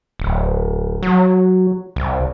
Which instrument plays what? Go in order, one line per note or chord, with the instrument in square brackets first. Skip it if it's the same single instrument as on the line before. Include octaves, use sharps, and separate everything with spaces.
[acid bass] D1
F#3
C2